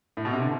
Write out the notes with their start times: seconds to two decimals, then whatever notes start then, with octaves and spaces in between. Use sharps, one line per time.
0.17 A2
0.25 B2
0.33 C3
0.42 D3